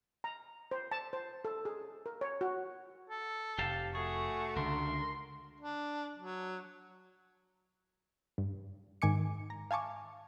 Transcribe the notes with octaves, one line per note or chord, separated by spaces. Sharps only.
A#5
C5
A5
C5
A4
G#4
A#4
C#5
F#4
A4
F1 G4 F5 A5
A3 F#4 G#4 C#6
C#2 D3 A#4 C6
D4
F#3
G2
G#2 D#3 G#5 D6 C#7
A#5
F5 G#5 A5 C#6 D6